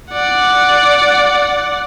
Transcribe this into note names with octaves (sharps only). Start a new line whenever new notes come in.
D5 F#5